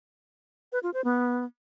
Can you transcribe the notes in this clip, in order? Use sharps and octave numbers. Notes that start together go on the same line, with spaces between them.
B4
F4
C5
B3